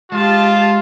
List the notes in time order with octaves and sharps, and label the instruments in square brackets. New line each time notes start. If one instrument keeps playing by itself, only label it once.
[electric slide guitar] G#3 [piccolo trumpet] F4 [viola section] G4 A5